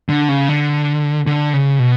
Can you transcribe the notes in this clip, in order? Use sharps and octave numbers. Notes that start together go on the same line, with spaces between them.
D3
C#3
D3
D3
C#3
B2